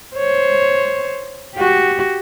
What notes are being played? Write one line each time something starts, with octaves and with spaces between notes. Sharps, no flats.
C5 C#5
F#4 G4